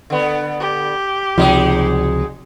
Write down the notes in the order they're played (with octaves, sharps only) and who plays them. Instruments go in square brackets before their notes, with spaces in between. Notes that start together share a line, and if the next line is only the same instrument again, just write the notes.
[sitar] D3 B3
[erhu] G4
[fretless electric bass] C#2 C3 F3 [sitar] F#3 G#3 D#4